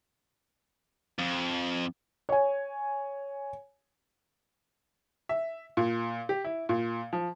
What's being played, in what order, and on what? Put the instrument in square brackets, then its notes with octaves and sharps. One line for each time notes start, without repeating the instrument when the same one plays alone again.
[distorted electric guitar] F2
[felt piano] C#5 G#5
[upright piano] E5
A#2
G4
E4
A#2
F3